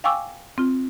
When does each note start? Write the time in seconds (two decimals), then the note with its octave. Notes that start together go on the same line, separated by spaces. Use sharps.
0.04 F5 G5 G#5 C#6 D6 E6
0.58 C4 F4